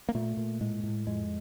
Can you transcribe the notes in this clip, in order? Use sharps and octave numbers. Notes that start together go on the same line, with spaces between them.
A#3
A#2 A3
A#2
A2 G#3
A2
F2 G#3